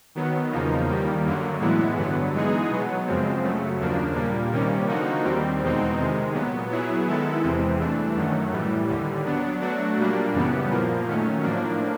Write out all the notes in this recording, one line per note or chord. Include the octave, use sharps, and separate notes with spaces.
D#3 F#3 B3
E2 C#3 F3 A#3 D#4
D#2 D#3 G3 A#3
F#2 D3 F#3 A#3
A2 E3 G#3 B3 E4
G2 D3 F#3 B3
E3 G#3 B3 D#4 G#4
B2 F#3 B3
F#2 C#3 F3 G#3 C4
F#2 C#3 F#3 A3
D#2 C#3 F3 A#3 D4
A#2 G3 A#3
C3 D#3 G3 A#3 C#4
D3 F3 A#3 D#4 F#4
D#2 D#3 G3 C4
E2 B2 G#3 C4 D#4
C3 D#3 G#3
A#2 F#3 B3
F#3 B3 E4 G#4
D#3 G#3 B3 E4 A4
E2 C3 E3 G#3 C4
G2 E3 A3 D4
F#2 D#3 F#3 A3
A2 E3 G3
D#2 D3 G3
F#3 B3 D4
F#3 A3 D4 F#4
A#2 G3 A#3 D4
F#2 C#3 E3 G3 B3
A#2 F3 A#3
D#3 F#3 A3 C#4
A2 F3 A#3 D4